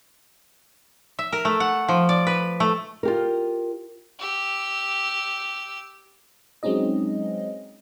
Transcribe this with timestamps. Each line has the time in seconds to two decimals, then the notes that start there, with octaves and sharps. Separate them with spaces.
1.19 E5
1.32 A#4
1.45 A3
1.60 F#5
1.88 F3
2.09 D5
2.27 B4
2.60 A3
3.03 F4 G4 A#4
4.19 G4 E6
6.63 F#3 G#3 C4 C#4 D#4 D#5